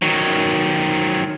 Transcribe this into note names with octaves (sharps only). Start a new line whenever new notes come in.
D#3 F#3